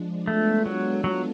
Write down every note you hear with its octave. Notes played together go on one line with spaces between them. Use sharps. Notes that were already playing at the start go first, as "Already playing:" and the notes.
Already playing: F3 G#3 D4
G#3 A3 B3 D4 F4 A4
F#3
F#3